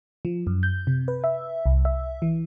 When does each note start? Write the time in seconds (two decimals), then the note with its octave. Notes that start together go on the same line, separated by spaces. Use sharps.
0.25 F3
0.47 F#2
0.63 G6
0.87 C3
1.08 B4
1.24 E5
1.66 C2
1.85 E5
2.22 E3